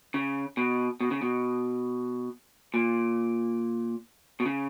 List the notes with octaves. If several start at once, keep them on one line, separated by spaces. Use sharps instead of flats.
C#3
B2
B2
C#3
B2
A#2
B2
C#3